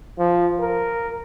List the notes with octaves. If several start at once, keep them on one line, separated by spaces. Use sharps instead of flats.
F3
A#4